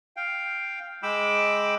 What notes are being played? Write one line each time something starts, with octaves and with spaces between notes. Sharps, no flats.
F5 G5
G#3 G5 B5 D6 E6